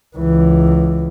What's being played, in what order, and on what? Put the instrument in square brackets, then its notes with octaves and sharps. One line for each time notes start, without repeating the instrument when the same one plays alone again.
[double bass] C#2 E3